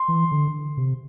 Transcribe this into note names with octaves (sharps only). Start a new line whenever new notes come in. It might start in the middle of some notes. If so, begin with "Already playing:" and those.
Already playing: C6
E3
D3
C3